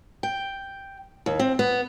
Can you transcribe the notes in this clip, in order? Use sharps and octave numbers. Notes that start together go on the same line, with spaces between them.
G5
D#2
C4
B3